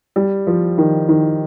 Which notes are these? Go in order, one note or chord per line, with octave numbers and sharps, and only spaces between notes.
G3
F3
D#3
D#3